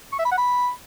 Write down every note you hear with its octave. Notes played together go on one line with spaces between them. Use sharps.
C#6
E5
B5
F#5
B5